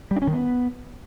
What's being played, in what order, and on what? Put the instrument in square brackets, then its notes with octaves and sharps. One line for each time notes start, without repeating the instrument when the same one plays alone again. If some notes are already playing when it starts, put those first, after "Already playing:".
[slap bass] G3
D4
C#4
D#3
B3